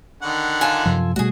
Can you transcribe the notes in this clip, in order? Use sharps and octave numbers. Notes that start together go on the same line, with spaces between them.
D3 D#3 F#5
F4 A4 G#5
F#2 C3 F3
B2 G3 A3 F#4 G#4